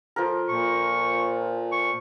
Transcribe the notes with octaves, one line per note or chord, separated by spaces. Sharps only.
F3 A4 A#4
A#2 C#6
C#6